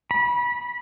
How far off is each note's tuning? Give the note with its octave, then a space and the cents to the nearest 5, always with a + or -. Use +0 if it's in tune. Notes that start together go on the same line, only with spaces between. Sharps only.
B5 -25